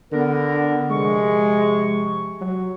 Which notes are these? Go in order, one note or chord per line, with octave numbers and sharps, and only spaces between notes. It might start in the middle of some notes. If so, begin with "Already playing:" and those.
D3 B3 A#4
C3 F3 G#3 C#6
F#3